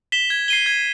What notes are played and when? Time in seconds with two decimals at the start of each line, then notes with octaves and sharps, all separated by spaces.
0.12 B6 E7 G7
0.30 G#6
0.48 C7 D#7 G7
0.66 G#6